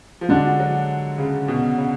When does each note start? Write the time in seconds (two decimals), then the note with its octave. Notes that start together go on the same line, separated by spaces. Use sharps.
0.21 F3
0.29 D3 G#3 D4 F#4
0.60 F#3
1.18 C#3
1.48 B2
1.78 C#3